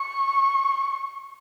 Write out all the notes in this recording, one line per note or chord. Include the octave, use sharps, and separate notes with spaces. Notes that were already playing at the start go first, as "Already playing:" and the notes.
Already playing: C#6